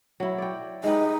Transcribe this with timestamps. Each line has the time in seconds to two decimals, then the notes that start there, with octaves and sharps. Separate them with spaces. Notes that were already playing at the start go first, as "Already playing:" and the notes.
0.20 F#3 E4
0.38 D5 G5
0.84 G#3 D#4 G4 B4